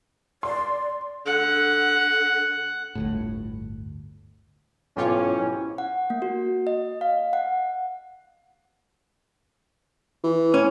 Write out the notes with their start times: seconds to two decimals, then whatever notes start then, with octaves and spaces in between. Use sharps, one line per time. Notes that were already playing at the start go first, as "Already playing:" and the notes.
0.43 D5 C6
1.26 D3 F#5
2.95 G1 D2 A2
4.97 B1 G#2 E3 C4 C#4 F4 G4 C#5
5.78 F#5
6.10 A#3
6.22 F#4
6.67 D#5
7.01 F5
7.33 F#5
10.24 E3
10.54 C#4